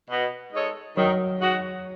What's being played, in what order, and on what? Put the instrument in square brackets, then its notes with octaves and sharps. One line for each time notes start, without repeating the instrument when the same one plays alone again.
[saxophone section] B2
G#3 D#4 A4 C#5
[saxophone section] D#3 [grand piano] F#3
[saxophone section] G#3 D#4 F#4